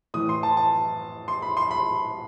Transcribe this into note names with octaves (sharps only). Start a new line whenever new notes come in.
A2 E3 D#6
C6
A5
A5
C6
B5
C6
B5